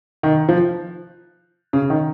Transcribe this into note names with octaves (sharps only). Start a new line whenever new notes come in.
D#3
F3
C#3
D#3